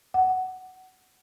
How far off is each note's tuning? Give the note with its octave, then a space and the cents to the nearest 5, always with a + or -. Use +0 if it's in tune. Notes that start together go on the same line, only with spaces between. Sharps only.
F#5 +15